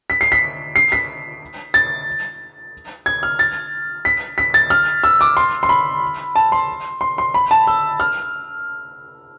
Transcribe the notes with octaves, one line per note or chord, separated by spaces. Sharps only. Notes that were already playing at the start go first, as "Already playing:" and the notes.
B6
C7
B6
C7
B6
A6
G#6
F6
A6
B6
B6
A6
F6
E6
D6
C6
C6
B5
A5
C6
C6
C6
B5
A5
E6
F6